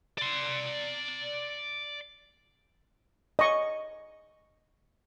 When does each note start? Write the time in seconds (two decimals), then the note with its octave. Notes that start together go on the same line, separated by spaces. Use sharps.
0.18 D5 C6
3.39 D#5 C#6